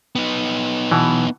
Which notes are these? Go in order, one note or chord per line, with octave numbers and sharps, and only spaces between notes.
B3 D#4
B2 E3